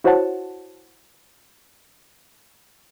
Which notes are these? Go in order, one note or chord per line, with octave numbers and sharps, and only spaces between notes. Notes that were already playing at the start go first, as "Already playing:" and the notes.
E4 F#4 C5 C#5 F#5 A5